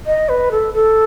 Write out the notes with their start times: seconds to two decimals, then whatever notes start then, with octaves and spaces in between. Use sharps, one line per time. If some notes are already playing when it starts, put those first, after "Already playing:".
0.06 D#5
0.29 B4
0.51 A4
0.74 A4